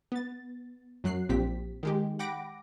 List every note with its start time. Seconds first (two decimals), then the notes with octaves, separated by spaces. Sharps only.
0.12 B3 A6
1.04 F#2 F#3 F#6 C7
1.29 A#1 A#2 C4 G4 B6
1.83 D#3 G#3 G4
2.19 F#5 G5 B5 D6 A#6 D7